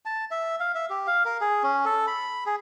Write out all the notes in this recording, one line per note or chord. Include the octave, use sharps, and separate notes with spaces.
A5
E5
F5
E5
G4
F5
A#4
G#4
C#4
A4
B5
G#4